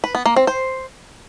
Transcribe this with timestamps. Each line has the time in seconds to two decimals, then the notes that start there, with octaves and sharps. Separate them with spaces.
0.04 B4
0.15 B3
0.26 A#3
0.36 C4
0.47 C5